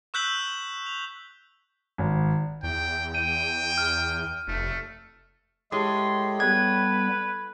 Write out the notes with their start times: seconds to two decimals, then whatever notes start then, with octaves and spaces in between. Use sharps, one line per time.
0.14 C#6 E6 F#6 G6 B6 F#7
0.86 F7
1.98 G#1
2.63 E2 G5
3.15 G5 D#7
3.78 F6
4.48 F1 A3
5.72 A2 G#3 G4 G#4 C6
6.40 G3 B3 B4 G#6